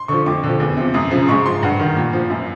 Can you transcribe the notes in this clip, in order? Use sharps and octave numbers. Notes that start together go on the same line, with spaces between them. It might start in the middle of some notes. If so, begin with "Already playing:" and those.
Already playing: C6
D3 F3 C#6
F2 D6
D3 F3
E2
C3 F3
F#2 D#6
C#3 F3
G#2 C#6
F3 C6
G2 F#5
D#3
A#2
F3
F#2